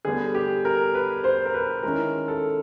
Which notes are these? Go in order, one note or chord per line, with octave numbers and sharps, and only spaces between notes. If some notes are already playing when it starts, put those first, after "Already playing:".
D3 G3 B3 G#4
G4
A#4
B4
C5
A#4
B4
D#3 G#3 C#4 E4 A#4
A4